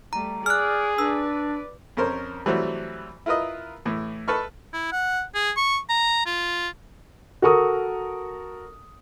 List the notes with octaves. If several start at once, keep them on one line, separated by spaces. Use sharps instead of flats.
G3 A3 A#5
G#4 D5 F6 F#6
D4 B4 D5 E6
F2 C#4 A#4 C5
E3 F#3 G3 A3 C4 F#4
E4 F4 A#4 B4 D#5
A2 E3
A4 B4 A5 B5 C#6 F6
E4
F#5
G#4
C#6
A#5
F4
F#4 A4 A#4 C#6 D#6